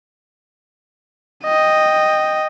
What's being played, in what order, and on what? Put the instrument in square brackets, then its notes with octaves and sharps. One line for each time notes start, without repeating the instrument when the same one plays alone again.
[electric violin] D#5 G5